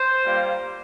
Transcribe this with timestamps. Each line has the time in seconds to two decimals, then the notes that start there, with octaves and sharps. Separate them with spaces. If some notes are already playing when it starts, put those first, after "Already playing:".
Already playing: C5
0.26 G3 A#3 F4